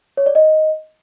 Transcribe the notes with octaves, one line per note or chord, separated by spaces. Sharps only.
C#5
D5
D#5